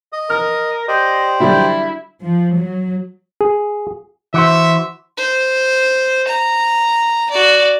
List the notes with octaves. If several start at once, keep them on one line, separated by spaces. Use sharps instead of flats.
D#5 D#6
A#4 F6
G4 C5 D5 D#5
D3 F#3 G3 E4
F3
F#3
G#4
E3 F#4 C5 E5
C5
A#5
F#4 D5